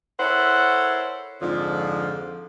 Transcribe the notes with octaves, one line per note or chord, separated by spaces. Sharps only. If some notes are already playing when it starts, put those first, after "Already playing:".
E4 A4 A#4 C5 C#5 F#5
F2 G#2 D3 F3